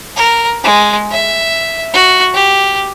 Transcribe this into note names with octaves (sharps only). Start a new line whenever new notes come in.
A#4
G#3
E5
F#4
G4